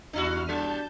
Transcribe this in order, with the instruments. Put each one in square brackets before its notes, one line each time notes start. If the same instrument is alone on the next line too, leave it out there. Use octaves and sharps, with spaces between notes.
[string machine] E2 F6 [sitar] D4 E4 F#4
[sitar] G3 [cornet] D4 [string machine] A5 G6